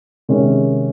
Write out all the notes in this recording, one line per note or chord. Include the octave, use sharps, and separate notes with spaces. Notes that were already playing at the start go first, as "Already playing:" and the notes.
C3 D#3 G#3 C#4